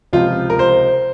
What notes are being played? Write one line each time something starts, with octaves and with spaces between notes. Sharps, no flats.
C#2 C3 F3 F4
A#4
C5